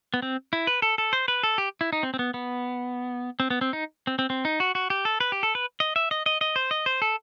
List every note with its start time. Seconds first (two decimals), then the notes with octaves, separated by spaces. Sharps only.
0.14 B3
0.22 C4
0.53 E4
0.67 B4
0.82 A4
0.98 A4
1.13 C5
1.28 B4
1.43 A4
1.58 G4
1.81 E4
1.93 D#4
2.03 C4
2.14 C4
2.19 B3
2.34 B3
3.40 C4
3.50 B3
3.61 C4
3.73 D#4
4.07 C4
4.19 C4
4.30 C4
4.45 D#4
4.60 F#4
4.75 F#4
4.90 G4
5.05 A4
5.20 B4
5.32 G4
5.43 A4
5.55 B4
5.80 D#5
5.96 E5
6.11 D#5
6.26 D#5
6.41 D#5
6.56 C5
6.71 D#5
6.86 C5
7.02 A4